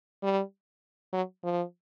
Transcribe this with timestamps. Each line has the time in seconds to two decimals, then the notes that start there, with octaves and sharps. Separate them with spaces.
0.22 G3
1.13 F#3
1.44 F3